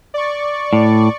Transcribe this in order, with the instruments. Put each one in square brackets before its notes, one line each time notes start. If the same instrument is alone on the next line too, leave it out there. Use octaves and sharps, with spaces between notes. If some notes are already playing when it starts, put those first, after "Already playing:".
[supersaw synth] D5 C#6
[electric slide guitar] A2